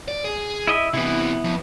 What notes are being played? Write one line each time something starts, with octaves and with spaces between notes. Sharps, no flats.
D5
G#4
E4 D#5 E5
C3 E3 B3 E4
F2